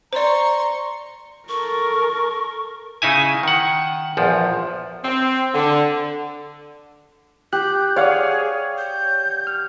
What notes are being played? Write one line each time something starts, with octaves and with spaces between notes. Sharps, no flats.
C5 D5 A#5 C6 C#6
A4 A#4 C#6
C#3 D#4 E4 G#5
D#3 F#5
A#1 E2 F3
C4
D3
G4 F#6 G6
G#4 C#5 D5 F5 F#5
G6
F6